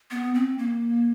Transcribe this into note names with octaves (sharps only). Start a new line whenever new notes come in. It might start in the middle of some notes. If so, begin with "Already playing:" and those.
B3
C4
A#3